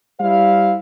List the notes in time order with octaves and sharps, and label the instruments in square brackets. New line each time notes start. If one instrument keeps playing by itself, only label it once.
[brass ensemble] G3 E4 C5 F5